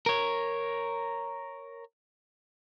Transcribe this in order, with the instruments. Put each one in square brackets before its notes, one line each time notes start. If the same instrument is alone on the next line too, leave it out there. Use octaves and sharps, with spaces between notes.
[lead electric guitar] A#4 C#5